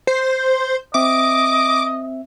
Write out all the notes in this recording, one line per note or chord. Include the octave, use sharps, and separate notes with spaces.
C5
C4 D#5 E5 D6